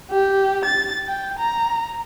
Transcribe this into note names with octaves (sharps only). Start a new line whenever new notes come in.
G4
A6
G5
A#5